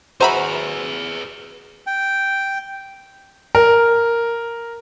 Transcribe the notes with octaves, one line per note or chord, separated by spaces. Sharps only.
F#4 G#4 B4 C5 E5 G#5 A#5 B5
G5
A#4